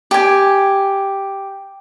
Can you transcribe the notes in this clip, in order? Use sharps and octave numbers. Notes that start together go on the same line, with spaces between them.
G4 G#5